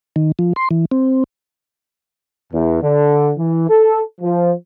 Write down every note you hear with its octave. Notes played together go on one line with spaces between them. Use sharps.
D#3
F3
C6
E3
C4
E2
D3
E3
A4
F3